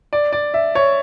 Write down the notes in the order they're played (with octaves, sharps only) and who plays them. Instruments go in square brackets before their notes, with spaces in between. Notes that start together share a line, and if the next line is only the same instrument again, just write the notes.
[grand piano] D5
D5
E5
C#5